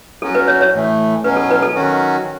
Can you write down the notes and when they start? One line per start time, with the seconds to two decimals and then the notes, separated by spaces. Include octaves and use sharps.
0.22 F#3 C#4 F#4 A4
0.35 B4
0.48 C#5
0.61 C#5
0.73 A2 E3 A3
1.24 B2 F#3 C#4 B4
1.37 A4
1.51 B4
1.63 A4
1.76 D#3 F#3 C#4 F#4